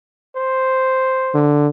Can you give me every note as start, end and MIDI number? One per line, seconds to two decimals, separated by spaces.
0.36 1.49 72
1.34 1.68 50